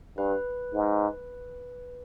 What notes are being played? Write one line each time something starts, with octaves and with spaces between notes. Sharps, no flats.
G2 B4
G#2